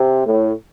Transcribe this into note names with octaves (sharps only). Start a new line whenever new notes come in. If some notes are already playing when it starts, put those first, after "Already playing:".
Already playing: C3
A2